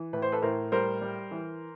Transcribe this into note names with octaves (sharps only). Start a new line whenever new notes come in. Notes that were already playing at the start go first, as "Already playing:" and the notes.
Already playing: E3
A2 B4
C5
A4 B4
A2 A#4 C5
G3 A#4 C5
G3
E3